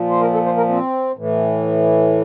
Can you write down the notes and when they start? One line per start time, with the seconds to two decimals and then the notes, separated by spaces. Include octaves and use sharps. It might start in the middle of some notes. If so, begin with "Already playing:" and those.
Already playing: A#2 F3
0.09 C5
0.21 A#4
0.33 A4
0.45 C5
0.57 A#4
0.69 C4
1.17 A2 E3